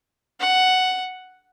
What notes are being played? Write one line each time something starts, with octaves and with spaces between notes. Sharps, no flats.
F#5